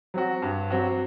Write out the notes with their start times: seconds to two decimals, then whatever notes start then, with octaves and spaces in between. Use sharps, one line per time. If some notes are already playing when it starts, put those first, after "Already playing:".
0.14 F#3 C4 F#4
0.42 G2
0.70 F#3 C4 F#4